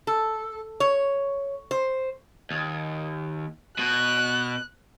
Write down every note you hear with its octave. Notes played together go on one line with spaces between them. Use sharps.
A4
C#5
C5
D#2
B2 F#4 F#6